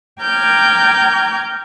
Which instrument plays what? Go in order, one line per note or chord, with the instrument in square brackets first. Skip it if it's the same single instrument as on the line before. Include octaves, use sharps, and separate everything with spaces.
[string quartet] G5 A#5 D6 F6 G6 G#6